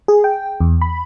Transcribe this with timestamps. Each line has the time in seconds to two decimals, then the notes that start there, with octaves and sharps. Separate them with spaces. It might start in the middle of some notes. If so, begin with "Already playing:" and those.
0.08 G#4
0.24 G5
0.60 E2
0.82 B5